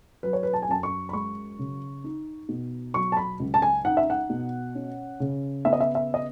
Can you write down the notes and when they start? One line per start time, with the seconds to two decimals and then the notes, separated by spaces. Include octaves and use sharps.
0.23 F#3 B4
0.33 C#5
0.43 B4
0.54 A5
0.62 G#5
0.68 F#2 A5
0.83 C#6
1.09 B5
1.13 G#3 C#6
1.59 C#3
2.04 D#4
2.49 B2
2.94 F#3 C#6
3.12 A5
3.17 B5
3.40 C#2
3.54 A5
3.62 G#5
3.85 D#4 F#5
3.97 E5
4.10 F#5
4.30 B2
4.75 C#4
5.20 C#3
5.65 B3 E5
5.73 D#5
5.81 E5
5.95 E5
6.14 D#5